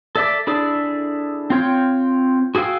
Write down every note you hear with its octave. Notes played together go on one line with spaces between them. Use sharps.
A4 D5 E5 D6
D4 E4 G#4 A4 D5
C4 F4 C#5 G5
F#4 G#4 A4 F5 G5